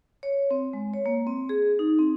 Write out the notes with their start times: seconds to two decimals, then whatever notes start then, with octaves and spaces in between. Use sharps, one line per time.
0.23 C#5
0.51 C4
0.73 G#3
0.94 C#5
1.06 A#3
1.27 C4
1.49 G#4
1.79 D#4
1.99 C4